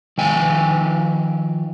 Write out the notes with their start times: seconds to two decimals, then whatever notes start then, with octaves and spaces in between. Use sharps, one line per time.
0.18 D#3 F3 G5 G#5